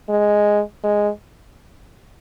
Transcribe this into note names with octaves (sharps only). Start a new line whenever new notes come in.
G#3
G#3